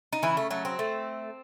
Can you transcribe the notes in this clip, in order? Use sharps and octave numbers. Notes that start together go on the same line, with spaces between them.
D#4
C#3 E3 E4
A3
F#3 A3
C4
A3